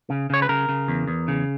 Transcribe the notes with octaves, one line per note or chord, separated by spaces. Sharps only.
C#3
C#3 C#5
B4
C#3 A#4
C#3
E2
E2
C#3